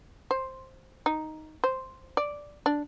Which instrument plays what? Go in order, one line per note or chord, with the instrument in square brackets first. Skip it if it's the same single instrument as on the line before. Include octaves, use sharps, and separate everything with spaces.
[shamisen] C5
D#4
C5
D5
D4